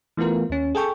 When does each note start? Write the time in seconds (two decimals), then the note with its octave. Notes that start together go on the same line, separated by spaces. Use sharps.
0.17 E3 A3 B3 F4 A#4
0.50 D#2 C#4
0.75 G#4 A4 G5 C#6